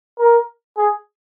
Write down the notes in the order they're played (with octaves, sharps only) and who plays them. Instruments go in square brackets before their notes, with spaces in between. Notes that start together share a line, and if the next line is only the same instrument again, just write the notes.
[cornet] A#4
G#4